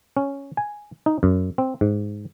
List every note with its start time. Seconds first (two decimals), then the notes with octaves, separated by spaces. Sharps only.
0.17 C#4
0.57 G#5
1.06 D#4
1.23 F#2
1.58 C4
1.81 G#2